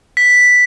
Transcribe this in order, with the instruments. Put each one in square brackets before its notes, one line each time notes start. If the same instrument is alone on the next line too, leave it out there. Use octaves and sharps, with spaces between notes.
[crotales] B6